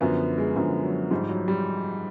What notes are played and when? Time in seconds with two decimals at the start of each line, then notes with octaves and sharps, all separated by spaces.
0.01 F#2 D3 F3 B3
0.38 G#3
0.56 F#2 D3 F3 G#3
0.84 F#3
1.11 G#2 F3 G3
1.29 F#3
1.48 G3